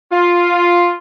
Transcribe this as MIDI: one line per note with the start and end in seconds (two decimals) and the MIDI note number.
0.12 0.96 65